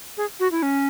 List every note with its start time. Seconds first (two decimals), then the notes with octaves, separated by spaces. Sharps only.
0.17 G#4
0.40 F#4
0.52 E4
0.63 C#4